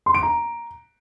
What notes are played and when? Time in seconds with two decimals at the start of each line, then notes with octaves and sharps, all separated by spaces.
0.06 C6
0.14 D7
0.23 A#5